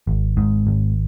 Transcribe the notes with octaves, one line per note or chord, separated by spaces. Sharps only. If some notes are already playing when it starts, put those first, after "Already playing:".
G#1
G#2
G#1